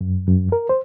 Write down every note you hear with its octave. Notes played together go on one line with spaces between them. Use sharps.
F#2
F#2
A#4
C5